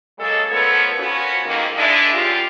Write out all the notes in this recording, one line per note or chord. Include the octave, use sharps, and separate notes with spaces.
C#3 F#3 G#3 A#3 A4
F3 A3 B3 A4 A#4 C#5
F3 B3 C#4 F#4
F2 G#2 D#3 A#3
G#3 D4 E4
F#2 F4 G4